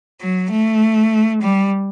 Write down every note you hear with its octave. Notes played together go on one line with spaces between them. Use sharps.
F#3
A3
G3